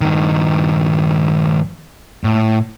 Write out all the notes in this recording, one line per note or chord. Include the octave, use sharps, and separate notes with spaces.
G2 D#3
A2